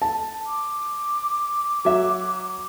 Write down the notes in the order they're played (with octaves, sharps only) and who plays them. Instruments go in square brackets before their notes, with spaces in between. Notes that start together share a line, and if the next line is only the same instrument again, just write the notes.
[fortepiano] A5
[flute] D6
[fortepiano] F#3 E5